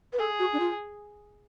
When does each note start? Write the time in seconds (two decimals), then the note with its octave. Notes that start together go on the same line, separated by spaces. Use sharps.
0.13 B4
0.19 G#4 A4
0.39 F#4
0.53 D4
0.60 F4